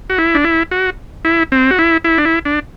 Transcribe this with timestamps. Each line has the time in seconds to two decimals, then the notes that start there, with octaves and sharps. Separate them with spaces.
0.10 F#4
0.18 E4
0.35 D4
0.44 E4
0.71 F#4
1.25 E4
1.52 C4
1.71 F#4
1.79 E4
2.04 E4
2.18 D4
2.25 E4
2.45 D4